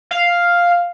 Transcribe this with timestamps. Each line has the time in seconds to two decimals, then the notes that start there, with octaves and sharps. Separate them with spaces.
0.11 F5